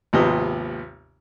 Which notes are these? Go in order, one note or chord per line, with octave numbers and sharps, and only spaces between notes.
G#1 D#2 C3 F3 B3 D#5